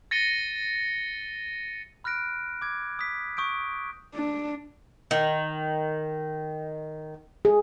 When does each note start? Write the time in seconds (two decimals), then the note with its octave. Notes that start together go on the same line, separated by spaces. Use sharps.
0.11 A6 A#6 C#7 D#7 G7
2.04 B5 F6 F#6 A#6 D7
2.62 D6 G#6
2.99 D#6 B6
3.37 C#6 D#6 G6 D7
4.14 D4
5.11 D#3
7.45 G#4